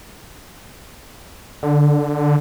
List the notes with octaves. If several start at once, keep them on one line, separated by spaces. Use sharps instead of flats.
D3